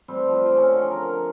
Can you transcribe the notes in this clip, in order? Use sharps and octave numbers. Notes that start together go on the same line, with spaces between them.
G3 A3 C4
F3
C5 D5
C#4
D3 G#4
A#4